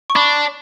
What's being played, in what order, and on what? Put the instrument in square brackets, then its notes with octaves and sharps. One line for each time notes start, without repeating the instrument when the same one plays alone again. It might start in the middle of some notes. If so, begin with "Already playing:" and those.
[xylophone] C#6
[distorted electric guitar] D4 [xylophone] B5 D6